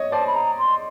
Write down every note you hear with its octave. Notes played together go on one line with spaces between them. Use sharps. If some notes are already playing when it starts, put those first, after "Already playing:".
Already playing: C#5 D#5
C5 D5 A5
B5
A#5
C6